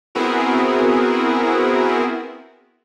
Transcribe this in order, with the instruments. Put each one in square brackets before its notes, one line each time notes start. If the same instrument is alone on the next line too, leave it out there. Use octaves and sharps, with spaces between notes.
[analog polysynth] B3 C4 E4 F#4 G#4 A#4